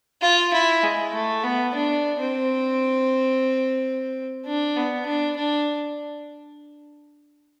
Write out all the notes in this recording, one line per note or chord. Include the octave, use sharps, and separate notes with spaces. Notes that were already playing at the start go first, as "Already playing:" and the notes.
F4
E4
G#3
A3
B3
D4
C4
D4
B3
D4
D4